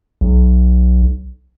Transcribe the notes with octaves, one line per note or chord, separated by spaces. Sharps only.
B1